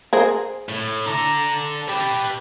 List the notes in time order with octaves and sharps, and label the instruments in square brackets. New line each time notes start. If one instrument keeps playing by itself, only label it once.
[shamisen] G#4 A#4 C5
[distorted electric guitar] A2
[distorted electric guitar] A4 D5 [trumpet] A#5
[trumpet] G4 [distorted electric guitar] B4 A5